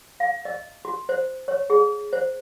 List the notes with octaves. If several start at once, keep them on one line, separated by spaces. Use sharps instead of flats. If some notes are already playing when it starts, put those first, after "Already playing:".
F5
D#5
F#4
C5
C#5
G#4
C5